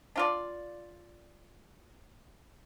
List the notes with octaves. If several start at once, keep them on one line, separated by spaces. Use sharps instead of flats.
D4 F4 D5